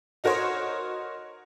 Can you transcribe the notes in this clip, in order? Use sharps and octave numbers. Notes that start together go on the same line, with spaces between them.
D#4 F#4 A#4 C5 C#5 D#5